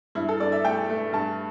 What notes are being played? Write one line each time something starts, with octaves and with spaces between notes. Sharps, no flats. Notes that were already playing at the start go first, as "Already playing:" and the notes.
G2 E4
A4
G2 D5
E5
A3 G5
A3
G2 A5